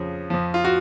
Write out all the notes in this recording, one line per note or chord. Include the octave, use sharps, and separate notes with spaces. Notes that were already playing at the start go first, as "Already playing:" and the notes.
Already playing: F2 C#3 F3
F2 F3
F4
F#4